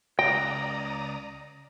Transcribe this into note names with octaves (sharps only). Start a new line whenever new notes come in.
C#2 D5 G5 A#5 D#6 A#6